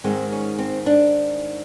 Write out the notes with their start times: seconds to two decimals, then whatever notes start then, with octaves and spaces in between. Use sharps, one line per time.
0.04 G#2 D#3 G#3 C4
0.32 C#4
0.59 C4
0.86 D4